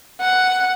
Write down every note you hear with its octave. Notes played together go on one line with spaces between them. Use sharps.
F#5